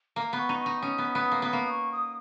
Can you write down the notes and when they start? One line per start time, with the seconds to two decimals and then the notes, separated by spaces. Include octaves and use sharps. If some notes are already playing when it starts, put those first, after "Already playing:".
0.16 A#3 A#5
0.33 B3
0.38 C#6
0.49 D#4
0.60 C#6
0.66 D#4
0.82 C#4 D#6
0.98 B3
1.15 B3 D#6
1.32 A#3
1.42 B3
1.47 D#6
1.53 A#3
1.69 C#6
1.92 D#6